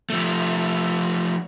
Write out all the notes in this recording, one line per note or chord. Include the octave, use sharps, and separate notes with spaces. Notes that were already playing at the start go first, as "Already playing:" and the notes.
F3 A3